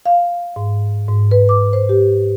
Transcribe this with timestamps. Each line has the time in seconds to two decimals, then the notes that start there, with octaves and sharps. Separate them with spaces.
0.06 F5
0.56 G#2
1.09 G#2
1.31 B4
1.49 D6
1.73 C5
1.89 G4